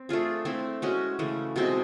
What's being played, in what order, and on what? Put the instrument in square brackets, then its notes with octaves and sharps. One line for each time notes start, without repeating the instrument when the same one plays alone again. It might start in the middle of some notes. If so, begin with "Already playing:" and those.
Already playing: [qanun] C4
A3 D4 F4 G#4
A3 C4 E4
G#3 C#4 F#4
C#3 E3 A3
B2 G#3 C4